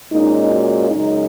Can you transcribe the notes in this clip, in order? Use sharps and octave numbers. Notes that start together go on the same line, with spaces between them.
A#2 G#3 C#4 D#4
F#4
F#2 C#3 G#3 D#4